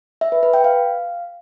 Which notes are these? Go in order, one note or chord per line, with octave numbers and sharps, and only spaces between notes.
E5
B4
B4
G5
F5